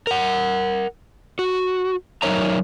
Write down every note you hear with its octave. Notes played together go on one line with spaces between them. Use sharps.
A#4 F#5
F#4
F#3 D#4 A#4 C#5 E5 A#5